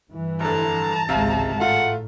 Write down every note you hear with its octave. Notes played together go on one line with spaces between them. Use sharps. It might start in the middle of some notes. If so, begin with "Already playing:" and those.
G2 E3
F1 D3 A5 A#5
G#1 C#2 C3 G#3 F5
A2 A3 F4 F#5